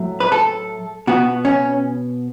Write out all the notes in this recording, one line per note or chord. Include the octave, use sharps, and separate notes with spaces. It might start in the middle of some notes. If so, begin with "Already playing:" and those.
Already playing: A2 F#3 A3
B4
A4
B2 B3 F#4
C#4